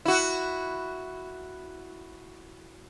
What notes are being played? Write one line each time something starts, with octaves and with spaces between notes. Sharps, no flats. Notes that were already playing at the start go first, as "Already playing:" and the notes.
E4 F#4